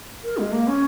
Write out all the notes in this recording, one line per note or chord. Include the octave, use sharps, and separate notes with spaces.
A#4
G#3
A#3
C#4